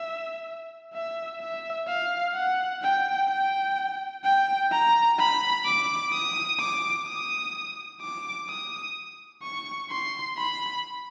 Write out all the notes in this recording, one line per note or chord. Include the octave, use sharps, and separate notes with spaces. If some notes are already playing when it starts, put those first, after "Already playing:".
Already playing: E5
E5
E5
F5
F#5
G5
G5
G5
A#5
B5
D6
D#6
D6
D#6
D6
D#6
C#6
C6
B5